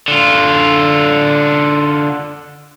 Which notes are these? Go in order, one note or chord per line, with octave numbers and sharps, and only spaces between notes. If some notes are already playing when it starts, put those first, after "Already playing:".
D3 F4